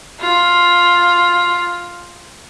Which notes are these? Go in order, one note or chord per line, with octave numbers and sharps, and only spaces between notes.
F4